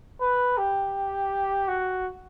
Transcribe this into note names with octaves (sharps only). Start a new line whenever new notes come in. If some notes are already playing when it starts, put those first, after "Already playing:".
B4
G4
F#4